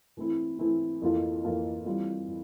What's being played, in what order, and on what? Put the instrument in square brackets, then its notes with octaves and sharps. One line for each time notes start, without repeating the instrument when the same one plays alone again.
[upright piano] E3 A3 C4 E4
E3 A3 C4 E4
F2 E3 A#3 F4 A4
F2 E3 A#3 F4 A4
E3 G3 C4 F4
E3